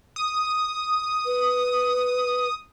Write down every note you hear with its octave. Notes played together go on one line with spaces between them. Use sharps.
D#6
B4